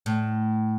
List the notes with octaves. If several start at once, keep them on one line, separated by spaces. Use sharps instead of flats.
A2